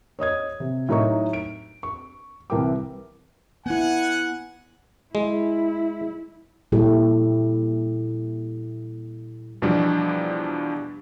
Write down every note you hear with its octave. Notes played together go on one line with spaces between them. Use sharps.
C#5 D#5 D#6 G#6
C3
A2 F#3 D#4 A#4 D#5 C#6
D7
C#6
C2 E3 A#4 E5 G5 D6
B3 E4 F#5 G#5
G#3 E4
A#2 G3 E4 G4 A4
E2 B2 F3 G3 D4